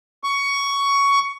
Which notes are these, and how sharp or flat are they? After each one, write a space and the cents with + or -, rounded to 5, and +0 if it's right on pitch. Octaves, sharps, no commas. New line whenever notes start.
C#6 +15